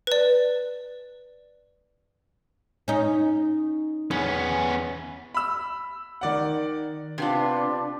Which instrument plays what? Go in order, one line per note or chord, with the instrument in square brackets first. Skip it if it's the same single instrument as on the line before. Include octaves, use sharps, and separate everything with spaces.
[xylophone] B4 D5
[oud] C#4 D#4
[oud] E2 [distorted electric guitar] B3 C#4
[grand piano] B5 E6
D#3 D5 F#5
[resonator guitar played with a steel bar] C3 B3 F4 [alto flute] D4